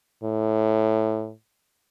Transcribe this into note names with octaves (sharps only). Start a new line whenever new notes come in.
A2